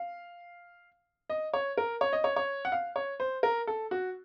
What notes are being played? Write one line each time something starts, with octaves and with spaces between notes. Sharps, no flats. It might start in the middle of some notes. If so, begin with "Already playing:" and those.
Already playing: F5
D#5
C#5
A#4
C#5
D#5
C#5
C#5
F#5
F5
C#5
C5
A#4
A4
F#4